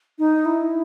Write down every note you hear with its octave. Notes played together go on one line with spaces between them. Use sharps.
D#4
E4